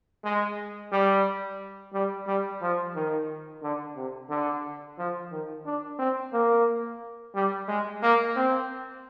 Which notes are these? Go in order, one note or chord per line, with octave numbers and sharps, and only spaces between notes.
G#3
G3
G3
G3
F3
D#3
D3
C3
D3
F3
D#3
D4
C4
A#3
G3
G#3
A#3
C4